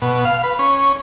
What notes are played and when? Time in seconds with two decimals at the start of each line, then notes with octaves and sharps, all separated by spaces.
0.02 B2
0.25 F5
0.44 B4
0.59 C#4